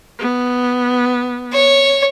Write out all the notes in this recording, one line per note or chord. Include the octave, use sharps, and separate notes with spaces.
B3
C#5